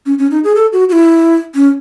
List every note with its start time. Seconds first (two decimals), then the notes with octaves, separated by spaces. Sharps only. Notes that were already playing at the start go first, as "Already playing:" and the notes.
0.06 C#4
0.18 C#4
0.31 D#4
0.44 G#4
0.55 A4
0.73 F#4
0.89 F#4
0.92 E4
1.55 C#4